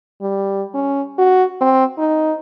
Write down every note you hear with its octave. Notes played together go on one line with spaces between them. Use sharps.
G3
C#4
F#4
C4
D#4